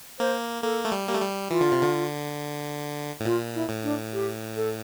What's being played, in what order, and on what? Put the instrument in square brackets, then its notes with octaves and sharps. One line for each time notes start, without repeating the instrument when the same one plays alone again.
[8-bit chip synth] A#3 [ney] C5
[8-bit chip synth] A#3 [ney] A4
[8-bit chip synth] A3
G3
[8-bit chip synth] A#3 [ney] G4
[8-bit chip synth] A3
G3
[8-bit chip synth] E3 [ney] F4
[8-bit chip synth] D3
C3
D3
A2
[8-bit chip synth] A#2 [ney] F4
[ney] E4
[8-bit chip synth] A2
[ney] D4
G4
A4